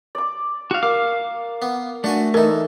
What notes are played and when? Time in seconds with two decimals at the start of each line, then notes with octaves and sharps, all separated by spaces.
0.15 D5 D6
0.71 F#4 F5
0.83 A#3 F5 D6 F6
1.62 B3
2.04 A3 D4 F#4 G#5
2.34 E3 D#4 A4 A#4 E5